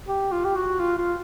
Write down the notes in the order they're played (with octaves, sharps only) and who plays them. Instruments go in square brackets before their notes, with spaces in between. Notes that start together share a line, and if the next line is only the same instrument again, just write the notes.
[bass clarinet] G4
F4
G4
F#4
F4
F4